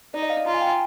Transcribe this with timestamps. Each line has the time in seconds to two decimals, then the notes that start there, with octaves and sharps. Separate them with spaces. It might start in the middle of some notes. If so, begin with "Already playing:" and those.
0.14 D#4 D5
0.22 D#5
0.30 F5
0.46 F4 A#5
0.54 G#5
0.62 G5
0.70 G#5